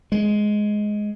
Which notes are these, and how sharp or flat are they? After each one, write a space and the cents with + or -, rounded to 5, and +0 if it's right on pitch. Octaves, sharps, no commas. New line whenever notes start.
G#3 +10